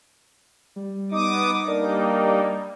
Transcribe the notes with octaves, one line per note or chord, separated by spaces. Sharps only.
G3
B3 D#4 D6 D#6
G3 A#3 D4 D#4 A#4